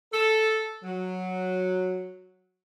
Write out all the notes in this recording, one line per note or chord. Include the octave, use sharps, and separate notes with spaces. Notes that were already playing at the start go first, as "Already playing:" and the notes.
A4
F#3